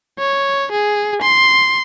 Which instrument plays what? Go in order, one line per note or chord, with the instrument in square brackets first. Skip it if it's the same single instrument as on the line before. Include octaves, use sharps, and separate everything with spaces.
[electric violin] C#5
G#4
C6